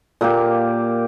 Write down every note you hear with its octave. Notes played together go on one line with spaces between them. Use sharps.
A#2 A#3 G4